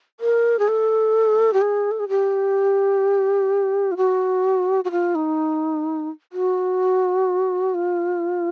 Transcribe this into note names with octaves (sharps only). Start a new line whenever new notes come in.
A#4
G#4
A4
G4
G#4
A4
G#4
G4
F4
F#4
F#4
F4
D#4
F#4
F4